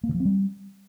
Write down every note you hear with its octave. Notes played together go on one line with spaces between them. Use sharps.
A#3
D3
F3
C4
G3